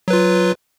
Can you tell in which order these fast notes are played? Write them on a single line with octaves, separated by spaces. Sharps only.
F#3 B4 F4